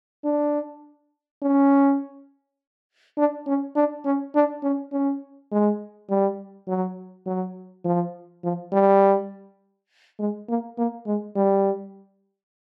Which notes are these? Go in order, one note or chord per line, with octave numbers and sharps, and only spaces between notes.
D4
C#4
D4
C#4
D4
C#4
D4
C#4
C#4
G#3
G3
F#3
F#3
F3
F3
G3
G#3
A#3
A#3
G#3
G3